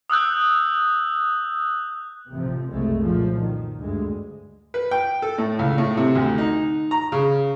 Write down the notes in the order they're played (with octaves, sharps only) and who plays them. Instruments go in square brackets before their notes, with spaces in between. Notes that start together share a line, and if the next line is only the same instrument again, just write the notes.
[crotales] D#6 E6 F#6 G6
[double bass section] A1 C3 F3
F#1 C2 G#3 A3
F#2 A#2 F3
D#3
D2 G2 G#3
[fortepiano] B4
G5
A4
A2
C#2
A2
C3
D2
D#4
A#5
C#3